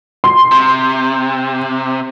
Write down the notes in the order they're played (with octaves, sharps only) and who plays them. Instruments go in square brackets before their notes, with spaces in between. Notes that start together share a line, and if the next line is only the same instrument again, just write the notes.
[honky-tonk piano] C6
[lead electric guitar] C3